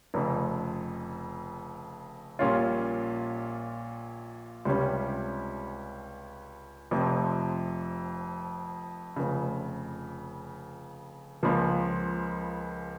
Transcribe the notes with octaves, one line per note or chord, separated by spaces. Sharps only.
F1 F2 C#3
A#1 A#2 G3 C#4 F4
C#2 C3 G3 C#4
F1 F2 C3 F3
F1 F2 C#3
C#2 C#3 F3 A#3